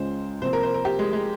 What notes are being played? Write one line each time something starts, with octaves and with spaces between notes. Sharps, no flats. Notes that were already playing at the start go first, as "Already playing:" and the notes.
Already playing: C#2 C#3 G#3 C#4 F4 C5
C2 C3 F3 A#3 C5
A#4
C5
A#4
G4
G#3
G#3